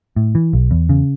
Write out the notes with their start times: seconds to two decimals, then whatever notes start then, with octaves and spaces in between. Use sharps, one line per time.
0.16 A2
0.35 E3
0.53 B1
0.71 E2
0.89 C#3